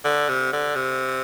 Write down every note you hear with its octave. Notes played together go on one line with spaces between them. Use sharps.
D3
C3
D3
C3